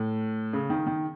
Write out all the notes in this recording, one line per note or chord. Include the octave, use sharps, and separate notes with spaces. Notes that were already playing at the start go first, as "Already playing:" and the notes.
Already playing: A2
C#3
D#3
D#3